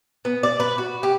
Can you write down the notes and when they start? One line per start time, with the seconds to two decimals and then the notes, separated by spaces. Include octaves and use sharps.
0.25 B3
0.43 D5
0.60 B4
0.78 F#4
1.03 G4